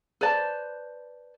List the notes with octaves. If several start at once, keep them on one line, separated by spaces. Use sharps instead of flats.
B4 C5 D5 A5